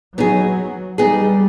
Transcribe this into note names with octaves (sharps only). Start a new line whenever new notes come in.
F#3 B3 D#4 G#4
G3 B3 D#4 G#4